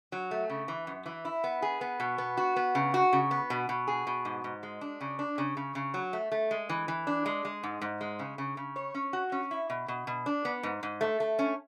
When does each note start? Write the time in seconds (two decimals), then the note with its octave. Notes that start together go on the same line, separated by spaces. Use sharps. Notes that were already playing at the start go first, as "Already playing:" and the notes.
0.12 F#3
0.31 A3
0.50 C#3
0.68 E3
0.87 F#2
1.06 E3
1.25 E4
1.44 B3
1.62 G#4
1.81 B3
2.00 B2
2.18 B3
2.37 F#4
2.56 B3
2.75 C#3
2.94 F#4
3.13 C#3
3.31 B3
3.50 B2
3.69 B2
3.88 G#4
4.07 B2
4.25 G#2
4.44 G#2
4.63 G#3
4.81 D4
5.01 C#3
5.19 D4
5.38 C#3
5.57 C#3
5.75 C#3
5.94 F#3
6.13 A3
6.32 A3
6.51 G#3
6.69 E3
6.88 E3
7.07 D4
7.26 G#3
7.45 G#3
7.63 G#2
7.81 G#2
8.01 G#3
8.19 C#3
8.38 C#3
8.57 C#3
8.76 C#5
8.95 C#4
9.13 F#4
9.32 C#4
9.51 E4
9.70 B2
9.88 B2
10.07 B2
10.26 D4
10.45 B3
10.63 G#2
10.83 G#2
11.01 A3
11.20 A3
11.39 C#4